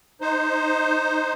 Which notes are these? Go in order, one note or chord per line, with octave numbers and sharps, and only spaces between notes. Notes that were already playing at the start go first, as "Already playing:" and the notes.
D#4 C5